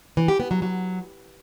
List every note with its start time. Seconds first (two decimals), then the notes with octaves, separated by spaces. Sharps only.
0.17 E3
0.28 G4
0.40 B3
0.51 F#3
0.62 F#3